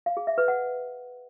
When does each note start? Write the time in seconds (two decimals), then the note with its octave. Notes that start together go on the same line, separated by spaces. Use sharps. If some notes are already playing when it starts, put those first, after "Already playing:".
0.06 F5
0.17 G#4
0.27 E5
0.38 B4
0.48 F#5